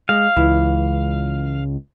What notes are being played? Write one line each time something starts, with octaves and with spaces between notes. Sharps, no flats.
G#3 F5
C#2 E3